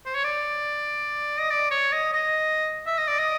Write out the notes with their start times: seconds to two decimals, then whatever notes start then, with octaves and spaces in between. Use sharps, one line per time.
0.06 C5
0.15 C#5
0.24 D5
1.40 D#5
1.51 D5
1.71 C#5
1.92 D#5
2.13 D#5
2.87 E5
2.98 D#5
3.08 D5
3.19 D#5